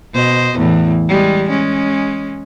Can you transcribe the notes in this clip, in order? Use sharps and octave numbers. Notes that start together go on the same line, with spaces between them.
B2 C5 D#5
E2 A2 E3
G3 G#3
G#3 C#4